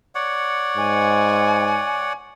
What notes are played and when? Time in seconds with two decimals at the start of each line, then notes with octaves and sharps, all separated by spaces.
0.15 C#5 D5 F#5
0.77 G#2 G#5